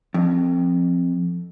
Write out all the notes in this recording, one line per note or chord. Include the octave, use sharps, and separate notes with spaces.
F2